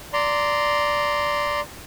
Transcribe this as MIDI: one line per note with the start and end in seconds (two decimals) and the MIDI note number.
0.13 1.60 74
0.13 1.60 82
0.13 1.60 84